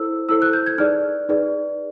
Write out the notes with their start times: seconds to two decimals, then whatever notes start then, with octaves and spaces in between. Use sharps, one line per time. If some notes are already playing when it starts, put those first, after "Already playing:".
Already playing: E4 A4 C5 E6
0.29 E4 A4 C5 E6
0.42 F#6
0.53 G6
0.66 G#6
0.78 D#4 G#4 B4 D5 F6
1.29 D#4 G#4 B4 D5